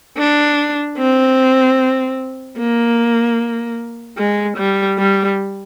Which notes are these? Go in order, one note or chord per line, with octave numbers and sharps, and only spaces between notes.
D4
C4
A#3
G#3
G3
G3